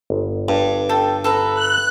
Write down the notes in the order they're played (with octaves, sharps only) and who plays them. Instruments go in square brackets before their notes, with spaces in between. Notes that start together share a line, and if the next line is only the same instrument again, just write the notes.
[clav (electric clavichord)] G1
[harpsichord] G2
[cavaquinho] A4 G5
A4 B4 A#5
[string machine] F#6